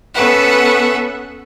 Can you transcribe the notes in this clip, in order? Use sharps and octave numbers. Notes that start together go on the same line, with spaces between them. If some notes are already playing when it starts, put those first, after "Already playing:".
B3 C#4 A4 B4 E5 F#5